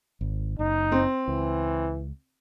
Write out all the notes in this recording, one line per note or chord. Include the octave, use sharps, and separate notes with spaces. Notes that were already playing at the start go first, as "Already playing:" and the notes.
G#1
F#1 D#4
C4
C#2 E3